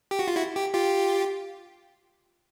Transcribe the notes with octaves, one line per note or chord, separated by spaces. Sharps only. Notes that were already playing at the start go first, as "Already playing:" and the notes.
G4
F#4
F4
E4 F#4
G4
F4 G4